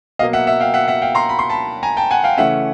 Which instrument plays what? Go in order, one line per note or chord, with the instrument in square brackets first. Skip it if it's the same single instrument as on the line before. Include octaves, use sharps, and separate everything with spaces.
[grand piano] B2 F#3 A#3 D#5 F5
E5 F#5
E5 F#5
F5 G5
E5 F#5
E5 F#5
F5 G5
A#5 C6
B5
C6
A5 B5
G#5 A#5
G5 A5
F#5 G#5
F5 G5
C#3 E3 A3 C#4 E5 F#5